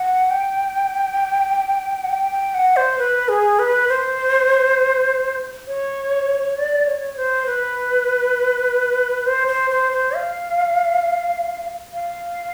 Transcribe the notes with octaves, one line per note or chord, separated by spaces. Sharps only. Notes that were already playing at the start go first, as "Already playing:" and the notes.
Already playing: F#5
G5
F#5
G5
G5
F#5
C5
B4
G#4
B4
C5
C#5
D5
C#5
C5
B4
C5
C5
C5
C5
F5
F5